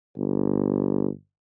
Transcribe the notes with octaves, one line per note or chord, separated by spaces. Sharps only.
G1